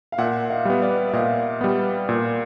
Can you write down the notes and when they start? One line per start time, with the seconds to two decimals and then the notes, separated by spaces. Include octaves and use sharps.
0.12 F5
0.18 A#2 E5 F#5
0.50 D#5 F5
0.65 G3 B3
0.82 D5 E5
1.09 E5
1.13 A#2 D#5 F5
1.61 G3 B3
2.09 A#2